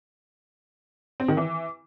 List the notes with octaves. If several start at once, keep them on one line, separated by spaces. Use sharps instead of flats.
C4
D#3
E3